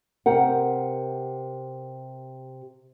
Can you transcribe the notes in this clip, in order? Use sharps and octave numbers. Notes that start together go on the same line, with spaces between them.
C3 G4 A#4 F#5